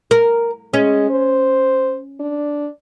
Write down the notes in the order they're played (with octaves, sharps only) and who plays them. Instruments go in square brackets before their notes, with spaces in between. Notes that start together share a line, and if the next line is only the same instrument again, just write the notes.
[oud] A#4
[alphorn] G#3 [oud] C#4
[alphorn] C5
D4